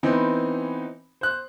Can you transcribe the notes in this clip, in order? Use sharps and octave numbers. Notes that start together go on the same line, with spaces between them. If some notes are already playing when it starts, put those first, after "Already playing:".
E3 B3 C4 D#4
C5 F#6